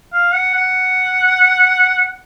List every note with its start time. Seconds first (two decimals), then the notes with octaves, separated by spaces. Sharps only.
0.13 F5
0.34 F#5
0.55 F#5